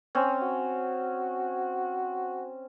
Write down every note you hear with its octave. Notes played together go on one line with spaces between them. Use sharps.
C4 C#4
F#4